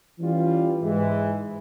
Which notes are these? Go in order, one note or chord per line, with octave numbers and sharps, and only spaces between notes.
E3 G3 C#4 F4
G#2 E3 G#3